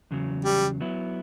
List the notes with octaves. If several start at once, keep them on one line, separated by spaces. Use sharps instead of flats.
E2 C#3 F#3
G3
F#3 B3 E4